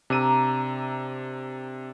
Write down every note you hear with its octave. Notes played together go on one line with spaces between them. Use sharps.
C3 D4 A#4 E6 D#7